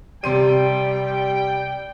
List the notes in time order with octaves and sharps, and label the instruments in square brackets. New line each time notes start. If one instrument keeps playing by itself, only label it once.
[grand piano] C3 C6 D#7 [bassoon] G3 [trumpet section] G5